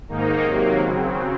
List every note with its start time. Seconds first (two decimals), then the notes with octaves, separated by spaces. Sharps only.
0.09 G#2 D#3 A#3 D#4
0.44 C3 D#3 F#3 A#3
0.81 C#3 F#3 C4